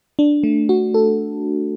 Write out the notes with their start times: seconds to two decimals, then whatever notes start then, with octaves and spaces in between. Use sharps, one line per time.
0.19 D4
0.43 A3
0.69 F#4
0.94 A4